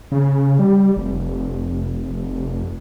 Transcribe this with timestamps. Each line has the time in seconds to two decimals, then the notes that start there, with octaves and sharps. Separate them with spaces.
0.12 C#3
0.59 G3
0.97 F1